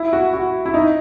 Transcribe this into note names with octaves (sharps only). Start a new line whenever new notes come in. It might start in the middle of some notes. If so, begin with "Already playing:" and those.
Already playing: E4
F#4
F#4
E4
D#4